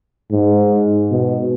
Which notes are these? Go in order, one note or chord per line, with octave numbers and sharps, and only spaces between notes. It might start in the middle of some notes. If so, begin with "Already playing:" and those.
G#2
B2